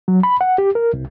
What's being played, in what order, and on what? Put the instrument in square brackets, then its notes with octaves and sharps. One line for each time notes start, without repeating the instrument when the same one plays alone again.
[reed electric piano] F#3
B5
F#5
G4
A#4
C2